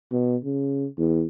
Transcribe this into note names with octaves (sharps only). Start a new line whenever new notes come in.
B2
C#3
E2